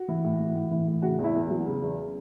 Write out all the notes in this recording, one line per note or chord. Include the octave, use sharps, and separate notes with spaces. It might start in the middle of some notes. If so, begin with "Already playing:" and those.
Already playing: F#4
E3
A2
E3
A2
E3
A2
C#3 F#4
E2
E4
E2
F#3
C#3
E2